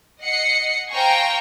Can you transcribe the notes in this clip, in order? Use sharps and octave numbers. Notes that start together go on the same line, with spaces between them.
D#5 F#5 C7 C#7
C5 F5 G5 G#5 A#5 C#6